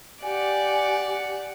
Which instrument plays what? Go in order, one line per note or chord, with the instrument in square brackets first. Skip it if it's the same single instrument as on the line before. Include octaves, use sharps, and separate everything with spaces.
[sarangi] G4 [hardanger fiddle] D5 F#5 [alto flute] G#5